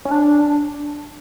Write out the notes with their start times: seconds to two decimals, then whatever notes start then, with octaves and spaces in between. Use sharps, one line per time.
0.05 C#4
0.11 D4